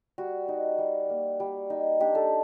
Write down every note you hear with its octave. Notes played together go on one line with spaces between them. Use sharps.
G3 F#4
D#4
G3
A#3
G3
D#4
D4 G4
A4